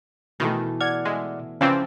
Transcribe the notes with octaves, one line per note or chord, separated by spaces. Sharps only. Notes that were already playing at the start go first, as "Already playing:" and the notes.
B2 D#3 E3 A3
D5 F#5 F6 G#6
G#3 E5
C#3 E3 F3 C4 C#4 D5 F5